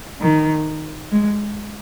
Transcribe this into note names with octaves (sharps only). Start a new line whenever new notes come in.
D#3
G#3